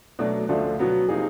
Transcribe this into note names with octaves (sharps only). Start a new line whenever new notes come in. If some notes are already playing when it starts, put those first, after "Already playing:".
B2 F#3 A3 D4
D2 D3 F3 A3
B2 F#3 B3
C3 F3 A#3 D#4 G#4